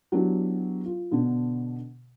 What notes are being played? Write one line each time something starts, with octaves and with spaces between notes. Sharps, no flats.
F#3 B3 D4 E4 F#4 G4
F4
B2 D3 B3 D4